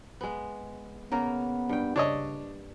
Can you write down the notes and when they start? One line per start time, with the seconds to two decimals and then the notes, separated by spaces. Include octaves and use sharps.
0.21 G#3 B3
1.12 C#3 A#3 B3 A#4
1.69 G2 G5
1.96 C#3 D4 C#5 D#5